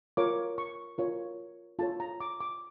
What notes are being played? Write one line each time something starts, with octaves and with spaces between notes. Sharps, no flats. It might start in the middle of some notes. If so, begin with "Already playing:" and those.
F4 A#4 C#5 D6
C#6
F4 A#4 C#5
F4 A4 C#5 A5
A#5
D6
D6